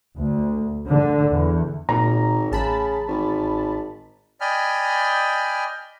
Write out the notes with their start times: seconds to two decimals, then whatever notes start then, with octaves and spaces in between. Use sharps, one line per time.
0.16 D2
0.88 D3
1.33 E2
1.89 G#1 A#2 A#5
2.51 A1 C#3 A5 B5
3.08 G#1
4.41 D5 D#5 G5 G#5 B5 F6